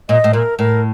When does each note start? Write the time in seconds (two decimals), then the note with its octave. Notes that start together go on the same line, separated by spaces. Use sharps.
0.09 A#2 D#5
0.24 A2
0.33 A#2 A#4
0.59 A2 A#4